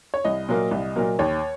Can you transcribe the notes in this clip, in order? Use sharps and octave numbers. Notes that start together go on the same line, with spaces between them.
C#5
C2 D#5
A#2 F#3 A#3
C2
A#2 F#3 A#3
D#2 C#5